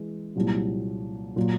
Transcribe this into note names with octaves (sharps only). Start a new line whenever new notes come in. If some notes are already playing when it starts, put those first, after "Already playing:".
Already playing: E3 G#3
C2 A#2 F#3
A#2 F#3